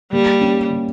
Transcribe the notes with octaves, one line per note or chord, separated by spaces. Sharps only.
G3 A#3
C#4
G3